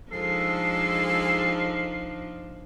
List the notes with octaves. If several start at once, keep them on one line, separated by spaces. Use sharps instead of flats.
F3 G#3 D4 D#4 A4 C7